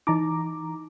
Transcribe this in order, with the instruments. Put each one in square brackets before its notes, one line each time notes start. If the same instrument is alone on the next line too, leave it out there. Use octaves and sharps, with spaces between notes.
[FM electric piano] E3 A#5 D6 [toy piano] D#4 D#5